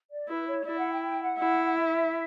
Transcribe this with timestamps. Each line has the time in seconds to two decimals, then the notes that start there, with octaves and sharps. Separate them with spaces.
0.11 D5
0.28 E4 B4
0.47 C#5
0.65 E4 D5
0.77 F#5
0.90 G5
1.02 G5
1.20 F#5
1.39 E4
1.75 E5